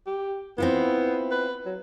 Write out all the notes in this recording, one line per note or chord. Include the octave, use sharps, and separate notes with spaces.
G4
B3 C4 E4 F4
B4
F#3